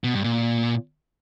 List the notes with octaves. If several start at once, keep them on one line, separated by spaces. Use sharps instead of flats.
B2
G2
A#2